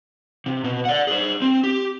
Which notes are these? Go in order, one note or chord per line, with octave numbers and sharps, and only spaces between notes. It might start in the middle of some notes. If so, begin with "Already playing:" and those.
C3
B2
D5 F#5
G#4 C5
C4
G4